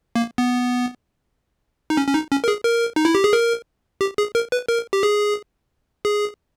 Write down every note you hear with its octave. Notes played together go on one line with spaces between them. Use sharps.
A#3
B3
D#4
C#4
C#4
D#4
C#4
A#4
G#4
A#4
D#4
E4
G4
G#4
A#4
G4
G#4
A#4
B4
A#4
G4
G#4
G#4